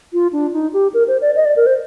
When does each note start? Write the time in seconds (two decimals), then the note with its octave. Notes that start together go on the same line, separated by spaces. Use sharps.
0.13 F4
0.33 D4
0.53 D#4
0.73 G4
0.94 A#4
1.08 C5
1.21 D5
1.36 D#5
1.45 D5
1.56 A#4
1.66 C5